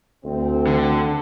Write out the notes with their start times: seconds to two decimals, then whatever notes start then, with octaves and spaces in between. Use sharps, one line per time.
0.24 D2 C4
0.67 D3